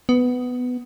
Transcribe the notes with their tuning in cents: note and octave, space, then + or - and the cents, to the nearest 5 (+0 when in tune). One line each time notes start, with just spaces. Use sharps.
B3 +10